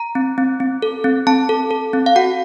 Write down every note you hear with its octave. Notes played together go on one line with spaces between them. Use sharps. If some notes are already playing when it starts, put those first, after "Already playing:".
Already playing: A#5
C4
C4
C4
A4
C4
C4 A5
A4
A4
C4
F5
F#4 F#5